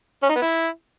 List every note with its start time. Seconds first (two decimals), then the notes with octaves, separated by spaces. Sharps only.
0.23 C#4
0.29 D#4
0.36 B3
0.42 E4